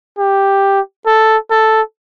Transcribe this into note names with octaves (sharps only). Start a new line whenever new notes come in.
G4
A4
A4